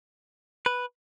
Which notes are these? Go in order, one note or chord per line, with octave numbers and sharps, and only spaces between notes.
B4